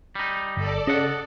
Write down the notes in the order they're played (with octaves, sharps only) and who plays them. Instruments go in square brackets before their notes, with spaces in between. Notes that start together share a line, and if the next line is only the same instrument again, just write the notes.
[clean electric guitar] G3 D#4
[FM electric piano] G1 [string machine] A4 D5
[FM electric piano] C#3 [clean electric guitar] D#5 F#5